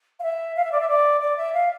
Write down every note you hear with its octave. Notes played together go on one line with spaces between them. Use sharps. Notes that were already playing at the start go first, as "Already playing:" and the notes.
F5
E5
F5
E5
D5
E5
D5
D5
E5
F5